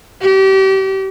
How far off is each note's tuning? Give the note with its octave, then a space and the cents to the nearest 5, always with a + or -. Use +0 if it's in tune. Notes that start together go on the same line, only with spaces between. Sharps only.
G4 -30